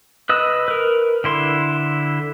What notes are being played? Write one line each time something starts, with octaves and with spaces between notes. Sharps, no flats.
B4 D#5 E6
A#4 B4
D3 E4 C6